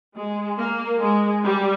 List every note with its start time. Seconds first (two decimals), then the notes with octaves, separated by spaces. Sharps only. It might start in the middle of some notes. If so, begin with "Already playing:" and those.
0.15 G#3
0.58 A#3
1.00 G#3
1.43 G3